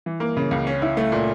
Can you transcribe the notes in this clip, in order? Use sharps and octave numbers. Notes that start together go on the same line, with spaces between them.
E3
A#3
C#3
C#2
C#4
E4
A3
A#2